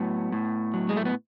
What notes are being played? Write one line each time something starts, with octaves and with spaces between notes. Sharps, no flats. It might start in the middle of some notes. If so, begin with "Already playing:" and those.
Already playing: A2 F#3 B3
A2
F#3
G#3
A3
B3